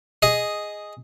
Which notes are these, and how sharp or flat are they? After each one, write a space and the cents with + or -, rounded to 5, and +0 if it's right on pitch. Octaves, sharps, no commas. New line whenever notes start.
G#4 +0 D#5 +0